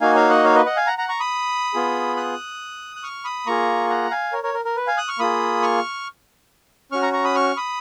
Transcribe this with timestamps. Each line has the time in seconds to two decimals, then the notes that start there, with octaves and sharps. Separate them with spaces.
0.01 A#3 D#4 F#4 F5 G#5
0.15 C#5 F5
0.29 D#5 F#5
0.44 C#5 F5
0.55 B4 D#5
0.66 D#5 F#5
0.77 F5 G#5
0.87 F#5 A#5
0.98 F#5 A#5
1.09 A#5 C#6
1.20 B5 D#6
1.74 B3 F4 G#4
2.17 D#6 F#6
2.96 F#6
3.03 C#6 F6
3.25 B5 D#6
3.46 A#3 F4 G#4 A#5 C#6
3.90 F#5 A#5
4.11 F5 G#5
4.33 A#4 C#5
4.43 A#4 C#5
4.54 A#4
4.65 A#4
4.76 B4
4.87 F5 G#5
4.97 D#6 F#6
5.08 C#6 F6
5.19 A#3 F4 G#4 B5 D#6
5.62 C#6 F6
6.92 C#4 F#4 C#6 F6
7.02 A#5 C#6
7.13 A#5 C#6
7.24 B5 D#6
7.35 C#6 F6
7.57 B5 D#6